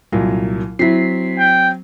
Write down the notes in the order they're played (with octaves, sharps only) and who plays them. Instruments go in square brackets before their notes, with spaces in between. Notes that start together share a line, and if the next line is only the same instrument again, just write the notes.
[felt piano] C2 A#2 F#3
[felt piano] F#3 C4 [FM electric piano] E4 B6 C7
[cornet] G5